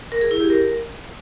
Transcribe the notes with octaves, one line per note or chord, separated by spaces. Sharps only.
A#4
G#4
E4
G4
A#4